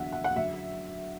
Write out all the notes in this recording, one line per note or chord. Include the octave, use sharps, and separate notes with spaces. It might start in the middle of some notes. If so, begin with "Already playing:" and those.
Already playing: E2 D3 F#3 E5 F#5
F#5
F#5
F#2 D3 F#3 E5